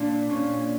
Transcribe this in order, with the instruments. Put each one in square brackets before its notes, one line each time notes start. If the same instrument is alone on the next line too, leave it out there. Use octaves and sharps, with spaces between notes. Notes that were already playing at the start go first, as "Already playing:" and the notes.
Already playing: [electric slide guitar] A#2 [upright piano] D4
[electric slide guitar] A#2 [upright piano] C#4